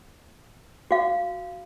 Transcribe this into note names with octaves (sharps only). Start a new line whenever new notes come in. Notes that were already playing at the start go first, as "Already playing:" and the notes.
F#4 F5